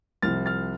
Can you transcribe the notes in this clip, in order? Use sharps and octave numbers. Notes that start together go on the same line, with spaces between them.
C2 C3 F3 F6 A6
F6 A6